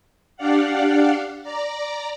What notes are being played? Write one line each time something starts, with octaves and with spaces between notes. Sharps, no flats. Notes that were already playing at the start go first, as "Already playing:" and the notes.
D4 G4 D5 F5 F#5
D5 A#5